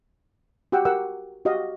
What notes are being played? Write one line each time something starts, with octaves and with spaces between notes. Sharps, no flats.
F#4 G4 F#5 G5 E6
G4 A#4 F#5 E6
F#4 G4 D#5 F5